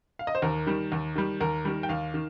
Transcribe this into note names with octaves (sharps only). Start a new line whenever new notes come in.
F5
D#5
C5
D#2 A#4
D#3 G3
D#2
D#3 G3
D#2 A#4
D#3 G3
G5
D#2 F5
D#3